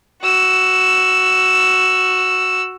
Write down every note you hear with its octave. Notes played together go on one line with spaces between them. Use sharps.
F#4 E6